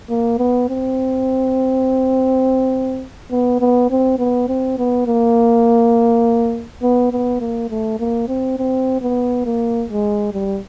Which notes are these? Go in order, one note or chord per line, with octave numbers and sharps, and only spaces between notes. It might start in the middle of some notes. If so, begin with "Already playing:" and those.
A#3
B3
C4
B3
B3
C4
B3
C4
B3
A#3
B3
B3
A#3
A3
A#3
C4
C4
B3
A#3
G#3
G3